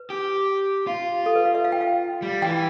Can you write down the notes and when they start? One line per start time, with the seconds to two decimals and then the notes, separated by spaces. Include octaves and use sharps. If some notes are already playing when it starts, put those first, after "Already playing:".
Already playing: B4
0.10 G4
0.87 F4
1.26 A4
1.36 B4
1.45 F5
1.55 E5
1.64 F5
1.72 G5
1.81 F5
2.22 G3
2.42 E3 G5